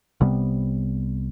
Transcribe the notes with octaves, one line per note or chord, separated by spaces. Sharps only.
C2 C3 G3 B3